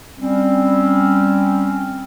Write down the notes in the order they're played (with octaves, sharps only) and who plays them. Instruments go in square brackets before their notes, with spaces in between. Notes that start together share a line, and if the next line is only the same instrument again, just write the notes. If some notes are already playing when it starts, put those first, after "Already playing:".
[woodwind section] G3 C4 C#4